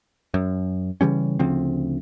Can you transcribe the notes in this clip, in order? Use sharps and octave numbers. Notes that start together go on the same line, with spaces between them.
F#2
C#3 E3 G3 C#4
D2 C#3 F3 C4